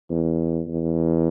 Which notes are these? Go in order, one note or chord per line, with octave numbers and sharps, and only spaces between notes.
E2
E2